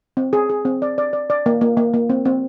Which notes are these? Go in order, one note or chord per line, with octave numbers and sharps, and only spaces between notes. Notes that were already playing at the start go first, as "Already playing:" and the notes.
C4
G#4
G#4
C4
D5
D5
D5
D5
A#3
A#3
A#3
A#3
C4
C4